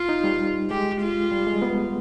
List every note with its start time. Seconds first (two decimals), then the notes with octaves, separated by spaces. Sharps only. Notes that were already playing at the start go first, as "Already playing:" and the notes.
Already playing: F4
0.09 D#4
0.24 G3
0.70 G#3 G4
1.01 F4
1.31 G3
1.47 G#3
1.62 B3